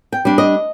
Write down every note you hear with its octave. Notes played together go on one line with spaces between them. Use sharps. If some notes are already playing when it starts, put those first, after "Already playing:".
G5
G3 D4
D#5